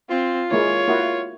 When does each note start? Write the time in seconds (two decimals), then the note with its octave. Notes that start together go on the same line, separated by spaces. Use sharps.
0.10 C4 F4
0.51 G#3 A#3 E4 C#5
0.87 A#3 E4 F#4